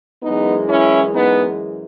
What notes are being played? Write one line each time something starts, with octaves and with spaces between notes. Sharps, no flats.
F#2 E3 G#3 B3 D#4
C#4 E4
B3 D#4